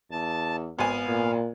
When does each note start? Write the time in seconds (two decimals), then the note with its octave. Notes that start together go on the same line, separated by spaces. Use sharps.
0.11 E2 A5
0.79 G#1 B3 F5 G#5
1.08 A#2